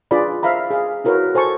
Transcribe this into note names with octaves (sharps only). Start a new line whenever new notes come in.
D4 F4 G#4 B4 D5 B5
C5 E5 F5 A#5 B5
G#4 F5
E4 F#4 A#4 B4 C#5
A4 C5 G#5 A5 C#6